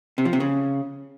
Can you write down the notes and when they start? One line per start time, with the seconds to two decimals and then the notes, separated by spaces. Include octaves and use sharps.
0.18 C3
0.25 F3
0.33 C3
0.40 C#3